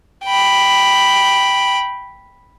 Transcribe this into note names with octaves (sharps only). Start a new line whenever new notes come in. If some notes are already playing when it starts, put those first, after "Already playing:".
G5 B5